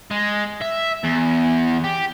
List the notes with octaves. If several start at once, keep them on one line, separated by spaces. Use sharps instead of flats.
G#3
E5
E2
G4